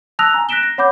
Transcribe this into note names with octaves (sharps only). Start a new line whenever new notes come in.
A5 D#6 E6 F#6 A#6 F7
G#5 A#5
F#6 A#6 B6 D7 E7 G7
A#6
C#5 F#5 B5 D6 G6